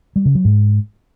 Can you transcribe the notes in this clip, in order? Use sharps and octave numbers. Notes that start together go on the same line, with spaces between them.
G3
C#3
F#3
G#2